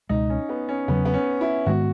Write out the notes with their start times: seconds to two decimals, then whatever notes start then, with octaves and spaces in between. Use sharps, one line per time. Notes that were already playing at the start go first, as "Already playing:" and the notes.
0.09 C#2 B2 G#3 D#4
0.30 C#4
0.49 B3
0.69 C#4
0.88 E2 C#3 F#3 B3
1.05 B3
1.14 C#4
1.41 E4
1.66 G#2 D#3 G#3 B3 F#4